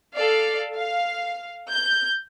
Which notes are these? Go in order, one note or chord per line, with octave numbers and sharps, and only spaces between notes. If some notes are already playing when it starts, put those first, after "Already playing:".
A4 D5 F5
F5
G6